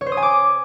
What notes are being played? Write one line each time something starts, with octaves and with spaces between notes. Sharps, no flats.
C#5
C5
D#6
G#5
D6